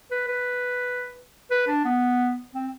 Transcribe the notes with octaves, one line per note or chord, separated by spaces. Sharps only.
B4
B4
B4
D4
B3
C4